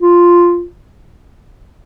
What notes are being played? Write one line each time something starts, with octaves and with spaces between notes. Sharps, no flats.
F4